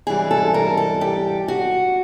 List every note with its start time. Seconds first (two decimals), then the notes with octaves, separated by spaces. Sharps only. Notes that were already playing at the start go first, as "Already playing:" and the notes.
0.07 G#2 E3 G3 G#4
0.31 A4
0.54 A#4
0.77 A4
1.01 G4
1.48 F#4